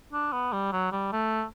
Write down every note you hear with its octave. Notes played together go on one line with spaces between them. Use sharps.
D4
B3
G3
F#3
G3
A3